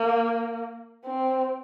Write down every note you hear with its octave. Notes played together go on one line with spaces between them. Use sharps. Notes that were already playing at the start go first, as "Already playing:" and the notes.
Already playing: A#3
C4